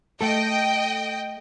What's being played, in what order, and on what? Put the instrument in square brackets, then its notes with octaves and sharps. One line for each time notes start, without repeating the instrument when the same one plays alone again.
[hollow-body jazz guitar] A3 A4 [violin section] D#5 G5